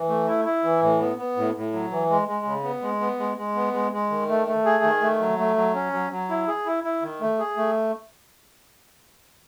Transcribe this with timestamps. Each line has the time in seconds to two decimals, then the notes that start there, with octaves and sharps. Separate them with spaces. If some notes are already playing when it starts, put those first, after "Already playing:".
Already playing: E3
0.09 A3
0.28 E4
0.45 E4
0.64 E3
0.82 A2
1.00 B3
1.18 B3
1.37 A2
1.55 A2
1.73 F#3
1.91 E3
2.10 G#3
2.28 G#3
2.45 C#3
2.64 B3
2.82 G#3
3.01 B3
3.19 G#3
3.37 G#3
3.56 B3
3.74 G#3
3.92 G#3
4.10 D#3
4.28 A3
4.47 A3
4.65 G#4
4.84 D#3
5.02 A3
5.20 F#3
5.38 A3
5.56 F#3
5.75 C#4
5.93 F#3
6.11 F#3
6.30 E4
6.48 G#4
6.66 E4
6.84 E4
7.02 D#3
7.21 A3
7.39 G#4
7.57 A3